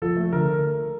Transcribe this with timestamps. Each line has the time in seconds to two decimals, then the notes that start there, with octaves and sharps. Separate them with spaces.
0.02 F3 A4
0.17 A3
0.32 D3 A#4